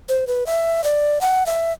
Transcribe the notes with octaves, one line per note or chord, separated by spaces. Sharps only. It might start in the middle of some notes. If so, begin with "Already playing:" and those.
C5
B4
E5
D5
F#5
E5